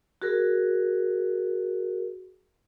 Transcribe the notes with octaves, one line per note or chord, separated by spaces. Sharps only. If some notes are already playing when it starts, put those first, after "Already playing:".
F#4 G#4 A#4